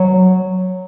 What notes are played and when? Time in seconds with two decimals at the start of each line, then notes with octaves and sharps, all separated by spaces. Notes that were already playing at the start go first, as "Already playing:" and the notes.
Already playing: F#3